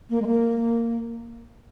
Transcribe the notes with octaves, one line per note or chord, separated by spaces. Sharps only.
A#3
G#3
A#3